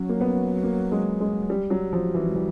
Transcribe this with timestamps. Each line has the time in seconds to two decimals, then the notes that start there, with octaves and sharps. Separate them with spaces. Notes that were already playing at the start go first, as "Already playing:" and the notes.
Already playing: F#3 C#4
0.09 A#3
0.21 B3
0.63 A#3
0.92 G#3
1.20 G#3
1.50 G3
1.70 F#3
1.93 F3
2.14 E3
2.28 G#3
2.35 E3 G3